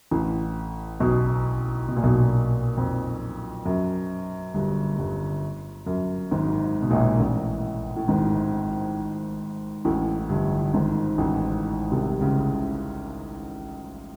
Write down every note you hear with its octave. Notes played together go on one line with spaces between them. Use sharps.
A1 A2
B1 B2
B2
A#2
B1 B2
F2
F#2
G1 G2
G1 G2
F#2
G#1 G#2
B2
A#1 A#2
A1 A2
A2
G#1 G#2
A1 A2
G1 G2
G#1 G#2
A1 A2
C2 C3
C#2 C#3